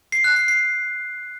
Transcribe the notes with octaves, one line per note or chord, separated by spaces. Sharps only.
C7
F#6
C7
C7